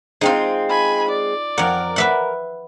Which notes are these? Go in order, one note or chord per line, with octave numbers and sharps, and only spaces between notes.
G#3 C4 D#4 F4
G#5 B5
D5
F2 A#4 F#5
B4 E5 F#5